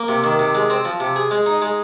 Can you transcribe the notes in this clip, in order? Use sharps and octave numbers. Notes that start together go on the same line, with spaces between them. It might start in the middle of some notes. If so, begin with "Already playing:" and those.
Already playing: A#3
C3
D#3
C3
G#3
C4
F3
C3
G#4
G#3
D#4
G#3